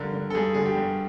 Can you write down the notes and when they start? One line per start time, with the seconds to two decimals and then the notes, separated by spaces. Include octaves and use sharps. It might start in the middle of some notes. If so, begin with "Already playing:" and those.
Already playing: G2 D3 A#4
0.13 D3
0.30 A4
0.35 G2 G#4
0.54 D3 G#4
0.65 G4
0.75 G2